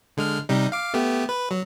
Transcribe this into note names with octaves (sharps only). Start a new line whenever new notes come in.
D3 G#3 F6
C3 G3 D#4
F5 D6
A3 B3 G4
B4
F#3